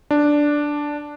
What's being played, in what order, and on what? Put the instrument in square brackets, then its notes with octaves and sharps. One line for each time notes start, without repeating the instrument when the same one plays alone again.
[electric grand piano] D4